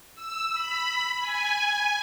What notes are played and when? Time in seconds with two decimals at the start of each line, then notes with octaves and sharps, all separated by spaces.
0.15 E6
0.52 B5
1.20 G#5